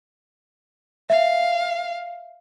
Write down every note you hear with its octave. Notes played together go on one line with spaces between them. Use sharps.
E5 F5